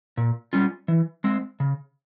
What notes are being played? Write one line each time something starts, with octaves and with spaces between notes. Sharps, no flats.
A#2
G3 C#4 F4
E3
G#3 C4
C#3